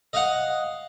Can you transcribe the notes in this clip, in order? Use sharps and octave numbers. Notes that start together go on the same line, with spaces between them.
D#5 F5 F#5